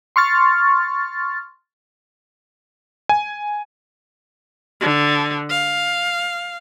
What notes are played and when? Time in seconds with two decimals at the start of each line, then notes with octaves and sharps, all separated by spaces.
0.16 C6 C#6 F6 A6
3.09 G#5
4.81 D3
5.50 F5